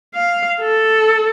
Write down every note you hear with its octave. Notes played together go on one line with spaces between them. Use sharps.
F5
A4